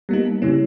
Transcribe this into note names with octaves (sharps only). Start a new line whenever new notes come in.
G3 A#3 B3 D#4
A#3
C#3 G3 C#4 E4